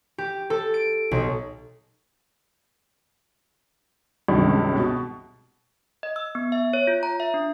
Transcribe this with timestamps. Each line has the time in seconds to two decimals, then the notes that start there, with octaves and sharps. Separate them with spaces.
0.18 G4
0.50 A4
0.74 D7
1.11 B1
4.28 C#2 G2 C3 D#3 F#3
4.76 B2
6.03 D#5
6.16 E6
6.35 B3
6.52 E5
6.73 C#5
6.87 F4
7.03 A#5
7.20 E5
7.34 D4